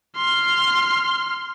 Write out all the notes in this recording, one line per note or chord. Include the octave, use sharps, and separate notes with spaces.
C6 F6